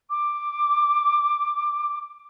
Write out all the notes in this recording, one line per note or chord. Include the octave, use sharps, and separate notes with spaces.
D6